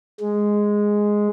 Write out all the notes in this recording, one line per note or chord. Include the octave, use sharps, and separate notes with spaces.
G#3